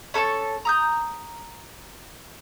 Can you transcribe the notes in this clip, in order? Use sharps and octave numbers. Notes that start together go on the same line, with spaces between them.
C#4 A4 A5 C#6
A#5 D#6 G6